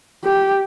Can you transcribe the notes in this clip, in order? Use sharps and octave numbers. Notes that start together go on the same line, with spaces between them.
G4